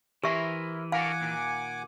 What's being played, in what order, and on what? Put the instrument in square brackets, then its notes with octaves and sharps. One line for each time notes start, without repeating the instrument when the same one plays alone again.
[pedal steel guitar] E3 [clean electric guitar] E4 A#4 C5 [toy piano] G4 E5
[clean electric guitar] D4 F#4 A#4 [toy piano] F5 [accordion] F#5 G#5 D6
[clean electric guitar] A#2 D#3